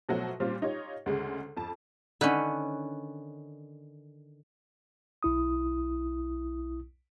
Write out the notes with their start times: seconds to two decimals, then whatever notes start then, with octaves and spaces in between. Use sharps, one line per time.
0.09 B2 F3 F#3 A3 E4 F#4
0.40 A#2 G3 C4 C#4 F4
0.62 D#4 F4 G4 C#5
1.06 D2 C#3 G#3
1.57 F2 A5
2.21 D3 D#3 C#4 B4
5.23 B1 E4 D#6